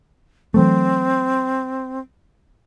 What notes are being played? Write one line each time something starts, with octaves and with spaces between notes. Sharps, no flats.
E3 F#3 A3 C4